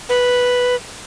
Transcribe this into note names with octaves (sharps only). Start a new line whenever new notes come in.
B4